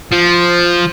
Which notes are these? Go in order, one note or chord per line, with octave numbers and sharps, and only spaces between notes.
F3